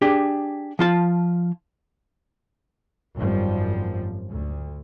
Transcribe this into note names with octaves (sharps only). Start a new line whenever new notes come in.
D4 G4 G#4
F3 F4 A5
G#1 F#2 F3 G3
D2